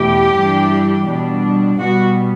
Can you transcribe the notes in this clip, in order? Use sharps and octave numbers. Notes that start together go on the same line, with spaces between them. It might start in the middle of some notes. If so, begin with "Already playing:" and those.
Already playing: E2 B2 A3 G4
G2 E3 G3 D4
B2 G3 D4
B2 G3 B3 F#4